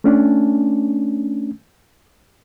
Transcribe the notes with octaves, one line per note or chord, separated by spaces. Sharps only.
A3 C#4 D4